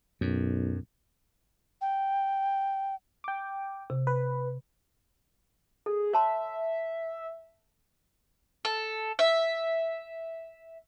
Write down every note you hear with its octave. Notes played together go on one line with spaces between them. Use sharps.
B1 F#2
G5
G5 D6
C3
B4
G#4 A4
C#5 E5 A5 C6
A4
E5